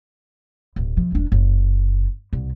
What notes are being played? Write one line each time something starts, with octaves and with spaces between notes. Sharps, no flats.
D1
C3 F3
E1 D4
F#1
C2